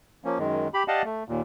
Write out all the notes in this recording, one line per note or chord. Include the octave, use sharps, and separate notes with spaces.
F3 A#3 C#4
F#2 D#3 G#3
G4 B5
G4 D5 D#5 F5 F#5 A5
A3
D#2 A#2